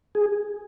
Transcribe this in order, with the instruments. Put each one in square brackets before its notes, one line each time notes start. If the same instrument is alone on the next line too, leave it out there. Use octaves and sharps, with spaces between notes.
[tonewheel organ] G#4